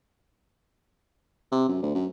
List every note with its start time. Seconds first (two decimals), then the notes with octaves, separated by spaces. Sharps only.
1.52 C3
1.69 F#2
1.82 D2
1.95 F#2